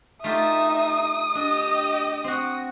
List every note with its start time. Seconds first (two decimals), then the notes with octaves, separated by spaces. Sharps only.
0.24 A3 D#4 F4 G4 E5 D#6
1.35 D4 G4 D#5
2.24 C4 F#4